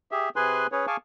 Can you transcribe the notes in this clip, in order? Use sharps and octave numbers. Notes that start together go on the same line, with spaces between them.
G4 G#4 E5
C3 G#4 B4 G#5 C6 F#6
C#4 G#4 B4 C#5
G#4 F5 G#5 A5 C#6 D6